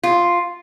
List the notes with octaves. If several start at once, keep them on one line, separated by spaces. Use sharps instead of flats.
F4